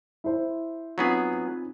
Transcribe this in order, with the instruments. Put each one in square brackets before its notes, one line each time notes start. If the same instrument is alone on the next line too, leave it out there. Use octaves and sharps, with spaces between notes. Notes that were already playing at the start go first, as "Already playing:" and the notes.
[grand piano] E4 C5
[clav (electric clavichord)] F#3 B3 G#4 [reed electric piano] C4 D#4 F4